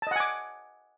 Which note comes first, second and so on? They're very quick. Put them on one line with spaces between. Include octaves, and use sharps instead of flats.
A5 D#5 F#5 G#5 D6